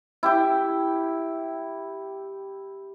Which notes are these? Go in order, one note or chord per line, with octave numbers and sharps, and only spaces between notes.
E4 G4 G5